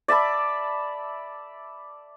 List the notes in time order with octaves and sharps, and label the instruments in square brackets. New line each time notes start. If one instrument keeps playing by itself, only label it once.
[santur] D5 E5 A5 B5